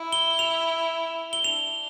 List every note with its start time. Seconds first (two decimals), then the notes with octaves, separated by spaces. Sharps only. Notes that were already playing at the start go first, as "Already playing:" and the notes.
Already playing: E4
0.12 G7
0.39 F7
1.33 G7
1.43 D4 F7